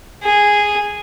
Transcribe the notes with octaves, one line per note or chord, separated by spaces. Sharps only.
G#4